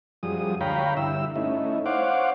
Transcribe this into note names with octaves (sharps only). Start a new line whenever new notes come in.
F#2 F3 G3 G#4 D#6
D2 C#5 F5 G5 A#5 B5
G2 D3 E4 E6
A3 C#4 D#4 E4
C5 C#5 F5 F#5 D6